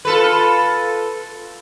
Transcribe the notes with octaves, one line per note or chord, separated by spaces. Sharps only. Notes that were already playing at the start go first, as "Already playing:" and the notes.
F4 A4 B4